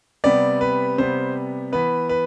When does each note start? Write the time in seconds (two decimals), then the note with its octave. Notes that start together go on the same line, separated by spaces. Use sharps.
0.24 C3 G3 B3 D5
0.61 B4
0.98 C3 G3 B3 C5
1.72 E3 B3 B4
2.09 B4